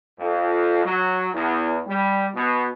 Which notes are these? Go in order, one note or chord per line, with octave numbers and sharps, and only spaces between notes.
F2
F#3
E2
G3
B2